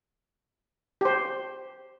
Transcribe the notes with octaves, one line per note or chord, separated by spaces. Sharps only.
G4 C5